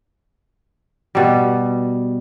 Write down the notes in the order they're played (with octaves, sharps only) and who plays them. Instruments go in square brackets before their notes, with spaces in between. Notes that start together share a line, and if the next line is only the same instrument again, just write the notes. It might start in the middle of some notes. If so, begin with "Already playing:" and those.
[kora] B2 G3